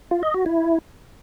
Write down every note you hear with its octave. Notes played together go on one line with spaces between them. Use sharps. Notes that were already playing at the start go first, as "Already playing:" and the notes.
F4
D#5
F#4
E4